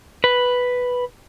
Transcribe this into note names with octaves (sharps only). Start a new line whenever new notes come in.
B4